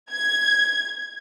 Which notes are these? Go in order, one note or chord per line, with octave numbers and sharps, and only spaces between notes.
G#6